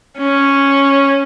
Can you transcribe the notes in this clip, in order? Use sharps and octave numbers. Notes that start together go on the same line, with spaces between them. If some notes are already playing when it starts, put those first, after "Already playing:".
C#4